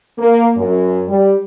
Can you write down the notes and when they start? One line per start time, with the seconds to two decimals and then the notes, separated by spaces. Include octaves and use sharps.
0.19 A#3
0.57 F#2
1.08 G3